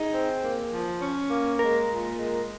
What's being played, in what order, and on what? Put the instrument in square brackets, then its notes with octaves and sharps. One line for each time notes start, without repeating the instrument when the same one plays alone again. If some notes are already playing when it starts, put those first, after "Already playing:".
Already playing: [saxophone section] D#4 [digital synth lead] G#4
[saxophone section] C4
A#3
F3
C#4
A#3
[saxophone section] G#3 [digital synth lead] A#4
[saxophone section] A#2
G#3